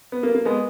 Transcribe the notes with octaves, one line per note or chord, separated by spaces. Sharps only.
B3
A#3
A#3
G#3 B3